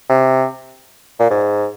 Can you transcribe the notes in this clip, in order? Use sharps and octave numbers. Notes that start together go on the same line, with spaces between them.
C3
A#2
G#2